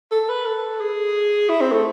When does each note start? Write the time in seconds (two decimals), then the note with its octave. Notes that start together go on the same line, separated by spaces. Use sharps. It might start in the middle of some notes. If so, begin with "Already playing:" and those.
0.11 A4
0.29 B4
0.46 A4
0.81 G#4
1.49 E4
1.61 C4
1.72 A3